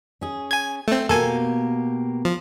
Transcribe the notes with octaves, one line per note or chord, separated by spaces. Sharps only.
C#4 G#4
G#5 G#6
A3 C4
B2 A#3 G4 A4 G#5
F3